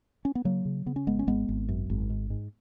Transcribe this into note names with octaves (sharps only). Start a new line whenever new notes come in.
C#4
B3
C#3 F#3 A#3
C#3
C#3 B3
C#4
G#1 G#3 B3
C#4
G#1 G#3 B3
G#1
F#2
G#1
G#2
G#2